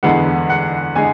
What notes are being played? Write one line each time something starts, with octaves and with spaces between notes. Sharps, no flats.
E2 D3 G#3 B3 F#5
F#5
D3 G#3 G#5